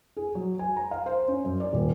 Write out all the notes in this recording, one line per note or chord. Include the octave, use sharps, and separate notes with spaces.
G#4
F#3
G#5
A#5
F5
C5
C#4
F#2
D5
D#1